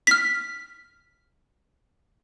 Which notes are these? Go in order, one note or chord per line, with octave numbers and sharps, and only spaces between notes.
F6 B6